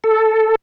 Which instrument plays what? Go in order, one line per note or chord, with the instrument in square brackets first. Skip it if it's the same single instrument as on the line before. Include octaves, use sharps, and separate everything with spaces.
[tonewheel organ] A4